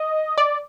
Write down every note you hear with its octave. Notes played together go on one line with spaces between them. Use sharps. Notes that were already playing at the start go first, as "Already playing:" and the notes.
Already playing: D#5
D5